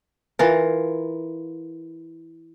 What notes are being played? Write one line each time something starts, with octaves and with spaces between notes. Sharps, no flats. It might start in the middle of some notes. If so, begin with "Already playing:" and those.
E3 F4 A#4